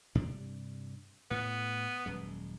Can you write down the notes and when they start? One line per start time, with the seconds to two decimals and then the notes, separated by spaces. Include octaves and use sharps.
0.15 G2 C3 D4
1.31 A2 B3
2.06 D#1 F#2 G#3